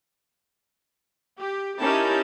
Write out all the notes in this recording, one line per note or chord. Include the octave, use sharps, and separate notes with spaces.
G4
C#4 D#4 E4 G4 A#4 A5